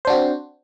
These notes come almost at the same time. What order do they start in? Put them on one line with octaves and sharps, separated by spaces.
C5 D4 F#4 C4